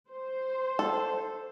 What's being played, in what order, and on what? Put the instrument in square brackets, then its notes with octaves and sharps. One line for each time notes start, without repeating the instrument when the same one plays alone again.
[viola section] C5
[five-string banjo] A4